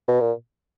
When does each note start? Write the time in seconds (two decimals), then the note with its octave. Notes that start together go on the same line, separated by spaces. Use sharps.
0.08 B2
0.20 A#2